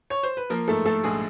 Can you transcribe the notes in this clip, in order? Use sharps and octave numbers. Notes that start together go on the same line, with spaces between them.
C#5
C5
B4
F3 A#3 A#4
G#2 A3 A4
A3 A#3 A4
A#1 G#3 G#4